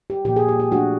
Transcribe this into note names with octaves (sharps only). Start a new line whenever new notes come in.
G4
A#2 F3 A#3 G4
G#4
G4
G4
F3 A3 D4 F#4